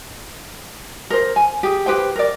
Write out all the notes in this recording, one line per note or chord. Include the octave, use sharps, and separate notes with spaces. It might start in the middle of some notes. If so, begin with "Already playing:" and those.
A#4 C5
G#5
G4 G#4
G4 B4 C5 G5
A#4 D5